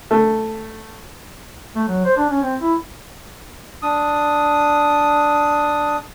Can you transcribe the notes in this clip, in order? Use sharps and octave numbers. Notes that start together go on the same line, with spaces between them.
A3
A3
F#3
C5
D4
C#4
C4
E4
D4 D#6